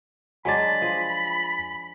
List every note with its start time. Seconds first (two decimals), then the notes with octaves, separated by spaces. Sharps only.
0.45 F#3 G#3 D4 G#5 B5 A6
0.82 F3 G#4